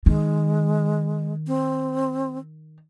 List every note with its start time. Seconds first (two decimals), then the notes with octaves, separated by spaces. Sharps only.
0.06 D#3 G#3
1.47 C4